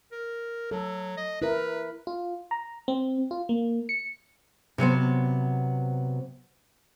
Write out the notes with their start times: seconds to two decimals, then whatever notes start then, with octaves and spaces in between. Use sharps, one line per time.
0.12 A#4
0.71 F#3 A4
1.17 D#5
1.42 E4 A#4 B4
2.07 F4
2.51 A#5
2.88 C4
3.31 F4
3.49 A#3
3.89 C#7
4.78 C3 F#3 B3 C5